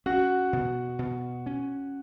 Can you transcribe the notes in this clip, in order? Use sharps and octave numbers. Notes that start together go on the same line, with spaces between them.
C#4 F#4 F#5
B2
B2
C#4